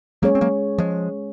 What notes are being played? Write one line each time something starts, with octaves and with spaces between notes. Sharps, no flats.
F#3 G#3 A#3 C#4 G#4 C#5
C4
F#3 A#3
F3 G#3